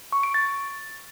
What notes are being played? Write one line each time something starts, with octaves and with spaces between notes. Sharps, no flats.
C#6
D7
A6